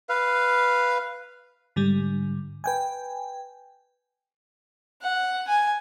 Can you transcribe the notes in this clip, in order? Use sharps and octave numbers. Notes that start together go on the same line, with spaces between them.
B4 F5
G#2 D3 G3
B4 G5 G#5
F#5
G#5